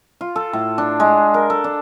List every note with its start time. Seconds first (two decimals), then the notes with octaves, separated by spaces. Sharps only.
0.21 F4
0.36 A4
0.53 A2
0.78 D4
1.00 G#3
1.34 A#4
1.50 A4
1.64 D4